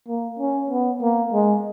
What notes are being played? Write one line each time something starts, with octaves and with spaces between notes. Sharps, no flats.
A#3
C#4
B3
A#3
G#3